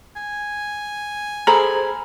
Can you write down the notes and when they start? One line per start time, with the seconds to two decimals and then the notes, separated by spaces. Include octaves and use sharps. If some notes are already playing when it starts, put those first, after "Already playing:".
0.16 G#5
1.47 G#4 A4 C5 A#5 B5 F6